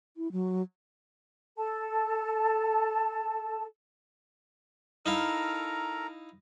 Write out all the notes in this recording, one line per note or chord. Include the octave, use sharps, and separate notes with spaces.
E4
F#3
A4 A5
D#4 E4 A4 A#4 F5 A#5